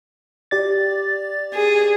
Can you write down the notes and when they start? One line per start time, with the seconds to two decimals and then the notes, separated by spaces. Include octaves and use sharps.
0.51 G4 D5 A6
1.54 G#4